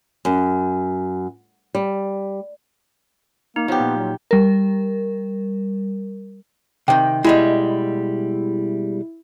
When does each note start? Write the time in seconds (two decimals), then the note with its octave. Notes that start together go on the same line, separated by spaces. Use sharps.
0.25 F#2
1.75 G3
3.56 A#3 D#4
3.68 F3 B3 G4 C#5
3.80 A#2
3.97 F#3
4.31 G3 A#4
6.88 C3 D#3 G5
7.24 B2 G3 G#3 E4